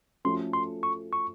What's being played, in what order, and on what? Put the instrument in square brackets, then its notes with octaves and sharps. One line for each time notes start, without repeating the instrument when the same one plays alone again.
[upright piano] F3 A3 C#4 F#4 A4 [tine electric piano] C6
[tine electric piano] C6
C#6
C#6